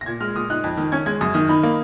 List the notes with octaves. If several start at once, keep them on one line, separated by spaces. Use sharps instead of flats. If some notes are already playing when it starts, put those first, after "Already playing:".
A#6
A#2 G#6
G#3 F6
A#2 D#6
D#4 F#6
F2
D#3
C#4 G#6
G#3 G#6
F#2 D#6
D#3 D#6
D#4 B5
A#3